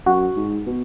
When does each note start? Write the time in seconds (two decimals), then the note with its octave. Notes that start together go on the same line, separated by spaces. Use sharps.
0.06 F#2 F#4
0.36 G#2
0.66 B2